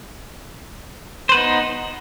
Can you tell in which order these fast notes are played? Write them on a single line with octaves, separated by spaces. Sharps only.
C5 B4 B3 D#4